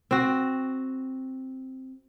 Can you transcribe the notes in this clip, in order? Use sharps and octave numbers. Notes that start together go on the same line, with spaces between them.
C4 F#4